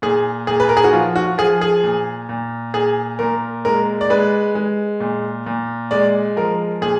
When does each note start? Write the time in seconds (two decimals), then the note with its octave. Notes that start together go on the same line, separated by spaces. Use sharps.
0.02 A#2 G#4
0.47 A#2 G#4
0.60 B4
0.69 A#4
0.77 G#4
0.84 F#4
0.93 F3 F4
1.16 F#4
1.38 F3 G#4
1.61 G#4
1.83 A#2
2.29 A#2
2.74 A#2 G#4
3.19 A#2 A#4
3.65 G#3 A#4
4.01 D5
4.10 G#3 B4
4.55 G#3
5.00 A#2
5.46 A#2
5.91 G#3 D5
6.36 F3 A#4
6.81 A#2 G#4